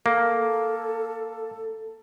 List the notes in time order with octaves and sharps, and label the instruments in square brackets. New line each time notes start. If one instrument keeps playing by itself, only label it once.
[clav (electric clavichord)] A#3 [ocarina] A4